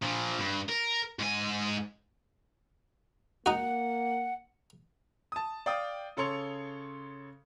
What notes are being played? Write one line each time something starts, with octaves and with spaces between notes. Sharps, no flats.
A#2 F3
G2
A#4
G#2 G#5
A#3 D#4 F#4 F#5
A5 D#6
D5 F5 G5 D#6
C#3 A4 C#5 C6 C#7 F7